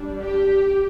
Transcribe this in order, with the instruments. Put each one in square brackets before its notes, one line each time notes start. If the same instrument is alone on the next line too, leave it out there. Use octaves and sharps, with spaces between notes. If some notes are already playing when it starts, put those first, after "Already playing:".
Already playing: [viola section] G3 D4
G4